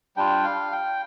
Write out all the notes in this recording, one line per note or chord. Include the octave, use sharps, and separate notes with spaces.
G3 D4 F4 G5
F5
G5